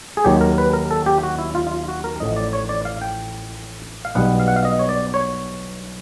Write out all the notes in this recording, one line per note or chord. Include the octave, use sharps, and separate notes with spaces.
G#4
D#2 D#3 F#3 G4
A#4
B4
A#4
A4
G4
F#4
E4
F4
F4
F#4
A#4
A1 A2 F3 D#5
D5
C#5
D5
F5
G5
F5
B1 B2 G3 B3 F#5
F5
F#5
F5
D#5
C#5
D5
C#5